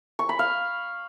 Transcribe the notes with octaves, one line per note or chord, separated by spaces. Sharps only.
C#6
B5
F5